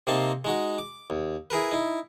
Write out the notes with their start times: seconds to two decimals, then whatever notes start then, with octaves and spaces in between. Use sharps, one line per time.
0.07 C3 A#3 C4 D#4 A5
0.45 G#3 D#4 F#4
0.78 D6
1.10 D#2
1.50 E4 G#4 A#4 B4
1.71 D#4 E4